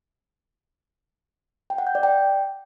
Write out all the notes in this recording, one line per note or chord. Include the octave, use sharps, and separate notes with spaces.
G5
F#5
G6
D5
G5